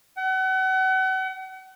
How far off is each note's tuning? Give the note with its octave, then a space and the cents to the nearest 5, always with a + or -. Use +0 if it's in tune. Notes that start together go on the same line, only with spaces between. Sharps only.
F#5 +35